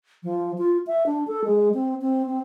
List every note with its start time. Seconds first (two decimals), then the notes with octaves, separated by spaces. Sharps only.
0.23 F3
0.58 F4
0.87 E5
1.06 D4
1.28 A4
1.44 G#3
1.74 C4
2.02 C4
2.27 C4